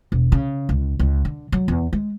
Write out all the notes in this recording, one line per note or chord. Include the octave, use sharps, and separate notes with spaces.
E1
C#3
C#2
C#2
D3
F#3
E2
G#3